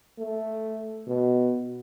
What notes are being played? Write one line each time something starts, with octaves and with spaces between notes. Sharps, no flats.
A3
B2